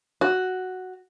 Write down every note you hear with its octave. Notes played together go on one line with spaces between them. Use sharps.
F#4